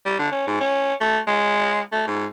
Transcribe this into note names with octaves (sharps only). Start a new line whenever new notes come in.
G3
D3
C#4
G#2
C#4
A3
G#3
A3
G#2